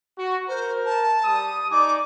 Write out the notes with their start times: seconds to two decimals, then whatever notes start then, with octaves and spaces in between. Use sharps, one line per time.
0.18 F#4
0.48 A#4 C5
0.85 A5
1.25 G3 D#6
1.72 D#4 D5 G#5 D6